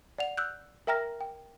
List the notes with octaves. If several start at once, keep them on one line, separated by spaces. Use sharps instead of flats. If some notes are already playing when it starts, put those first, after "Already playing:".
D5 F#5 F7
E6 F#6 G6
A#4 E5 G5 A#5 F6 A#6
G5